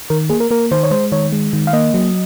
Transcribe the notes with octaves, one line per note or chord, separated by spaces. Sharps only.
D#3 A#4
A#3 G#4
A#4
A#3 A#4
D#3 C5
C#5
G#3 C5
D#3 C#5
G#3
D#3
F5
A#3 D#5
F#3